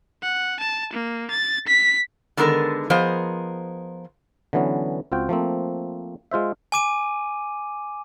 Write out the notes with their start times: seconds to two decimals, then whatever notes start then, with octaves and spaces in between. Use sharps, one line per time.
0.23 F#5
0.60 A5
0.93 A#3
1.31 A6
1.67 B6
2.37 D3 D#3 G#3 B3 A4 A#4
2.90 F3 B3 G#4 A#4 C5 D#5
4.53 D3 E3 F#3 B3 C#4
5.12 C#2 C4 F4 F#4 G5
5.29 F3 A3 A#3 C4
6.31 G#3 F4 C5 E5
6.72 G#5 D6 D#7